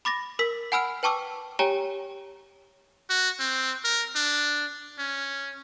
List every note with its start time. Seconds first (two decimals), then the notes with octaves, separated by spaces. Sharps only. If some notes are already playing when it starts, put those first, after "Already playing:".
0.05 B5 D6 A6 A#6
0.39 A#4 E6 B6
0.72 F#5 G#5 B5 E6 F6 D7
1.03 B4 G5 A5 C#6 D6 E6
1.59 G4 C#5 G5 G#5 A#5 G7
3.10 F#4
3.40 C4
3.84 A#4
4.16 D4
4.99 C#4